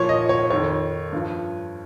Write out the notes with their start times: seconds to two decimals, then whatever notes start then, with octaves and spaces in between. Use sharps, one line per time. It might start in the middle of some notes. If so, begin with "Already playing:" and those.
Already playing: A#2 F3 C#5
0.09 D#5
0.29 C#5
0.50 F2 D#3 C#5
1.12 G2 F3